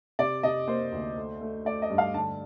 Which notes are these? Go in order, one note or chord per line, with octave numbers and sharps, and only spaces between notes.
C3 D5
C3 D#5
A#3 C5
D2
A3
A3
A3 D5
D#5
G2
F5
D3 A5